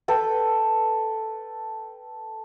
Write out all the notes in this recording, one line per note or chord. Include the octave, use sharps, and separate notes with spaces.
A4 B4 G5